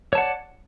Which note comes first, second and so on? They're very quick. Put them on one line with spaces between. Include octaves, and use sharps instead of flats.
C#5 A5 F#5 D5